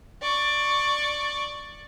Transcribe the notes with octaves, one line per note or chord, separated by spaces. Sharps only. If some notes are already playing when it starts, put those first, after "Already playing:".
D5 C#6